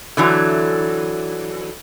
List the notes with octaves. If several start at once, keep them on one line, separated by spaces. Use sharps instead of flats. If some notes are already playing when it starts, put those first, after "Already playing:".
D3 E3 F#3